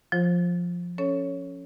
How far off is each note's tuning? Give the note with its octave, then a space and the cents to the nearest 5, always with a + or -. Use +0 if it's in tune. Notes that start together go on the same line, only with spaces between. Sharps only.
F3 +5 F4 +0 C5 +20
C#4 +0 A4 +0 C#5 +0